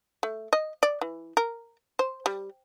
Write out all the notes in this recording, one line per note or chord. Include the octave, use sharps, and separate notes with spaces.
A3
D#5
D5
E3
A#4
C5
G3